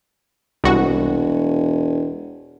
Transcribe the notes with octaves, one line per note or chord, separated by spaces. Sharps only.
E1 C2 F#4